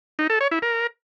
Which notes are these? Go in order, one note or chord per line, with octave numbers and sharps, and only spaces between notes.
D#4
A4
C#5
E4
A#4